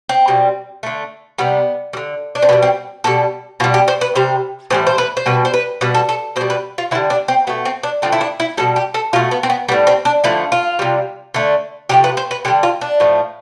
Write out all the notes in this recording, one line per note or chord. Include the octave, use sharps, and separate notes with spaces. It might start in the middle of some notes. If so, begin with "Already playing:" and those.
C4
B2 G3
D3 A3
C3 G3 B3
G3
D3
D4
C4
B2 G3 B3
C4
B2 G3 A4
B2 G3 F4
G4
C5
B4
C3 G3 C5
A2 E3 G3 C5
C5
B4
C5
B2 G3 B4
C5
B4
B2 G3 B4
A4
A4
B2 C5
G3
B4
F4
D3 G3 E4
D4
C4
B2 A3 B3
C4
D4
D3 F3 A3 C4
E4
D4
E4
B2 G3 A4
G4
A4
B2 A3 F4
B3
C4
B3
A2 G3 B3
C4
D4
D3 F3 A3 E4
F4
C3 G3
D3 A3
C3 F3 A3 G4
B4
C5
B4
D3 G3 G4
F4
D4
A2 F3 A3